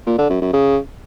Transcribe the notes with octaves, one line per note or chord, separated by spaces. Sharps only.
A#2
D3
F#2
F#2
C#3